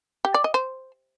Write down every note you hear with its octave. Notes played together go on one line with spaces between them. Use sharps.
G4
D5
D#5
C5